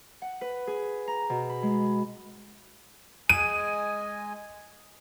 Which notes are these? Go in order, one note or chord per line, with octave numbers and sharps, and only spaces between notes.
F#5
B4
G#4
A#5
B2
B5
G#3
G#3 D#5 G#5 D#7